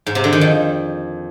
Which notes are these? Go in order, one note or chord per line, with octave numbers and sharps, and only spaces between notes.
G#2
C3
D3
D#3
F2